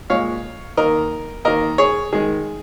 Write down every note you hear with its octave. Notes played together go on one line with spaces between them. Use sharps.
A#2 G#3 C#5 F5
D#3 A#3 A#4 D#5
D#3 A#3 A#4 D#5
G#4 C#5
D#3 G#3 G#4